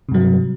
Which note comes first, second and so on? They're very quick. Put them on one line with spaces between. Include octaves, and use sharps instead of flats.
C3 G2 F#3